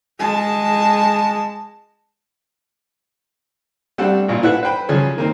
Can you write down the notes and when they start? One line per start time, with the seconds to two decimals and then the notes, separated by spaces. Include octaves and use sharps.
0.19 G#3 A5
3.98 G3 A3 C4 D4 A4 F#5
4.28 A1 A#2 F4
4.43 E4 A4 B4 F#5
4.63 B4 C5 G5 B5
4.89 C#3 F3 F#3 C#4 G#4 C#5
5.16 D#3 A#3 C4